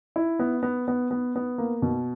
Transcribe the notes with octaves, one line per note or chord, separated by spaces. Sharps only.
E4
B3
B3
B3
B3
B3
A#3
B2